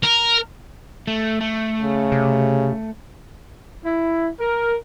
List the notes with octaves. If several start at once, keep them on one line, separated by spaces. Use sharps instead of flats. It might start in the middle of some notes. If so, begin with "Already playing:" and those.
A#4
A3
A3
C#3
C3
E4
A#4